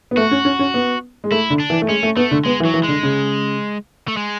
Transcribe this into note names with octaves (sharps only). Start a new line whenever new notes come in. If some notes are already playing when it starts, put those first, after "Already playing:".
B3
A3 F#4
C#4
C#4
C#4
B3
G#3
A3 E4
D3
D4
E3
A3
G#3 C#4
A3
A3 B3
D3
G#3 B3
E3
F#3
E3
D3 G#3
C#3
A3
G#3